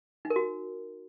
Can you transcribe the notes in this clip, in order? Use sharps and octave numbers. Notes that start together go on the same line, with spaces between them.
D#4
A#4
F#4